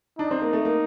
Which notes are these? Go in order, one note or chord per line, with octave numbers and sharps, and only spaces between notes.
D4 D#4
C4
A#3
A3
A#3